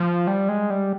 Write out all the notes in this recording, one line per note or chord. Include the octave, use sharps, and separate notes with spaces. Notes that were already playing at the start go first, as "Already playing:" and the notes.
Already playing: F3
G3
G#3
G3